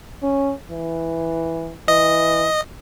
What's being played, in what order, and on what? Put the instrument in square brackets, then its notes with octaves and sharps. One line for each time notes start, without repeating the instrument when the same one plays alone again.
[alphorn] C#4
E3
[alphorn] E3 [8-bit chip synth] D#5